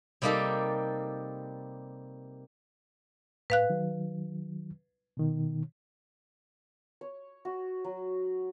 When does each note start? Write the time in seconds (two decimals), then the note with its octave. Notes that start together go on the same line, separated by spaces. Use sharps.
0.22 C3 G3 A#3 D#4 G4 A4
3.50 A2 B4 F5 F#6
3.70 D#3 F#3
5.17 B2 D#3
7.01 C#5
7.45 F#4
7.84 F#3